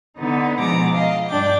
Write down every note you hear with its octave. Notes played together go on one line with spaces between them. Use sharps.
D3 B3 D#4
B2 F3 G#3 A#5 D6
D#5 F5
G2 D4 G5 D6